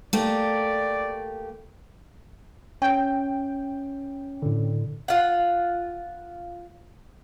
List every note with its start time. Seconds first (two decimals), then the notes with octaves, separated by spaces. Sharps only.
0.13 A3 A#3 G4 D5
2.82 C#4 G5
4.42 A2 D3
5.08 F4 F#5